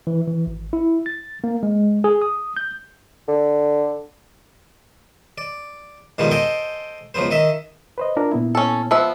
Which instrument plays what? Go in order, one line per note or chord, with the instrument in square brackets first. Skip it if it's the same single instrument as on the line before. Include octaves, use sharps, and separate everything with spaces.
[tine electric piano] E3
E3
G#1
E4
A6
A#3
G#3
G#4
D#6
G6
[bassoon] D3
[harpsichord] D5
G#2 B2 D#3 F3 G3 D#4
A4 C5 D#5 G5 G#5
C#2 F3 F#3 B3 C5
D#3 D#5 E5
[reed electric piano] B4 C5 D#5
D4 F4 A#4
A#2 B3 E4
[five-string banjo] C#4 A4
F3 B3 E5